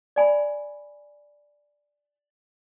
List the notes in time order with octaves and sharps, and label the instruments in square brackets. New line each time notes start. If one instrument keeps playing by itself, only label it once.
[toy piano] D5 G#5 B5